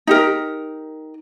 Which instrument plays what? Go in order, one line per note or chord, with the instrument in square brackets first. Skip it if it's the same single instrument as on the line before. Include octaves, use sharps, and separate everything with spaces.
[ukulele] D#4 G4 A#4